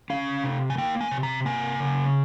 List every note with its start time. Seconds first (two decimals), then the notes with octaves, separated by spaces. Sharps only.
0.10 C#4 F5
0.44 C3
0.70 G#5
0.78 A#3 G5
1.01 G#5
1.11 C3
1.23 A#5
1.45 A#3 G#5
1.80 C#3